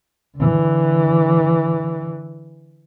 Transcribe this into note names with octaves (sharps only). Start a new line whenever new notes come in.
D3 E3